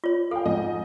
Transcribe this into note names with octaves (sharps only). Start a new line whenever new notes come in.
F4 C#5
A4 F5 G5
F2 G#2 D#5